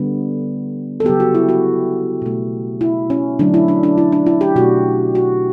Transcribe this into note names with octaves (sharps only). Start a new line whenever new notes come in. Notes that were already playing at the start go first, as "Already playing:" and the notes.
Already playing: D3 G3 B3
A4
C#3 F#3 B3 G4
F#4
E4
F#4
B2 A3
E4
C#4
D3 F#3 A3 D4
E4
D4
D4
E4
D4
E4
G4
B2 A3 F#4
F#4